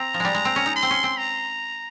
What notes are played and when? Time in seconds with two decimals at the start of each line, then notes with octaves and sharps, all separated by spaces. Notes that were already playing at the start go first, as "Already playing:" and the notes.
Already playing: C4 A#5
0.14 F3
0.20 G3 G#3
0.34 G#3
0.45 C4
0.56 C#4
0.66 D#4
0.76 C6
0.83 C4
0.90 C#4
1.03 C4
1.17 A#5